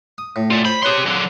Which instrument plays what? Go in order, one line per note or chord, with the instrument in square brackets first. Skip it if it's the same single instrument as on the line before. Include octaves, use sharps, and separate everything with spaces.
[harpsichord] D#6
A2
[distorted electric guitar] F4 D5
[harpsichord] C5 [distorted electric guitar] B5
[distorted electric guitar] G4 C6 [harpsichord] G#4 B4 C#5
[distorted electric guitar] D3 F#3